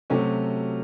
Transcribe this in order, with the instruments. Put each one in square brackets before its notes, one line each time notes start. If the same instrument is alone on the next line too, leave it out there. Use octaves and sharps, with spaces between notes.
[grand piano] C3 F#3 A3 C#4 F#4